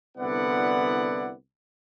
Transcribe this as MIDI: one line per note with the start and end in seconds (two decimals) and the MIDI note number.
0.18 1.32 36
0.18 1.32 50
0.18 1.32 59
0.18 1.32 64
0.18 1.32 74
0.18 1.32 78